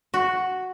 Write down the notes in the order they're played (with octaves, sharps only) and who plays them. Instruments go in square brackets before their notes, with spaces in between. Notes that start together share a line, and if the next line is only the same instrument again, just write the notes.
[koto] F#4